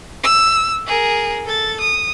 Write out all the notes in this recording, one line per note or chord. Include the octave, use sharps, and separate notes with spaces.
E6
G#4 A#4
A4 A6
D#6